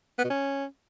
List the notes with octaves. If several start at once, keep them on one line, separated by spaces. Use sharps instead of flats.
B3
B2
C#4